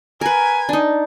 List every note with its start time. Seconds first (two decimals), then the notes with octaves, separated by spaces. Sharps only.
0.21 A#4 B4 G#5
0.69 D4 D#4